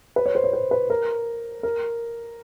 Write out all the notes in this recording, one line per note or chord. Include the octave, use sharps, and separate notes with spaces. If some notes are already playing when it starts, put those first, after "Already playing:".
B4
C#5
C5
C#5
C5
B4
A#4
A#4